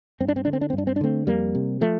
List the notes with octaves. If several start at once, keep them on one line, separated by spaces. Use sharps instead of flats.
G2 C4
D4
C4
D3 D4
C4
D4
C4
G2
D4
C4
D4
D3 A3 C4
F2 G3 A#3
C3
F3 A3